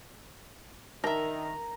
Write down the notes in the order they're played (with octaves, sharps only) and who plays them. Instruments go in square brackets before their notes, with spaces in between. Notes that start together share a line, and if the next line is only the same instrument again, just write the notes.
[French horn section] D#3 [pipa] D4 E5 [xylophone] A#4 [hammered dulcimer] A#5